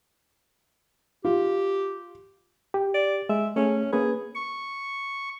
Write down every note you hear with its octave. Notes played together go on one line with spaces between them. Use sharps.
F4 G4
G4
D5
G#3 E5
A3 C#4 G#4
A#3 C#4 G#4 B4
C#6